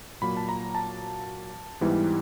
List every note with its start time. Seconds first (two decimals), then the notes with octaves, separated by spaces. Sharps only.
0.21 A#2 F#3 A#3 B5
0.37 A5
0.49 A#5
0.75 A5
1.81 G#2 E3 G3 B3 E4